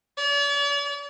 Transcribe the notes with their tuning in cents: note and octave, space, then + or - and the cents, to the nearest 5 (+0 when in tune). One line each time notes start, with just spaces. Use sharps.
D5 -45